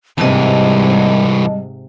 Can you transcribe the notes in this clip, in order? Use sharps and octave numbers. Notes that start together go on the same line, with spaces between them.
C2 G#2 C3 E3 G3 D#5 A5